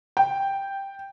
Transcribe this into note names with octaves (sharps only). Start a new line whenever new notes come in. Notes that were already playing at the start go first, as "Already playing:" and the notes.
G5